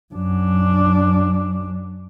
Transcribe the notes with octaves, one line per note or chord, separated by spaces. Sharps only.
F#2 D4